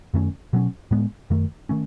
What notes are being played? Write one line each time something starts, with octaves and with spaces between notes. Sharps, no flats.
F#2 D#3 A3 C#4
B2 F#3 C#4
A2 G#3 B3
F#2 D#3 A3
D#3 A3 C#4